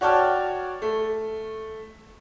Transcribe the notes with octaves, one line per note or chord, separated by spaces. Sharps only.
F#4 C#5 D5 G5 A5 F6
A3